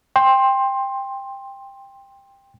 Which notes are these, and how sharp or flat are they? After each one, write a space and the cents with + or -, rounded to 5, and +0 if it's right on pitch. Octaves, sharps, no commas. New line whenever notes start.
G5 +15 C6 +15